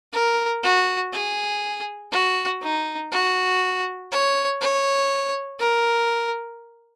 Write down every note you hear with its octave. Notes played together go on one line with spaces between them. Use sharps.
A#4
F#4
G#4
F#4
D#4
F#4
C#5
C#5
A#4